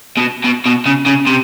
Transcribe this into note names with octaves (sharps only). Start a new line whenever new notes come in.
B2
B2
B2
C#3
C#3
C3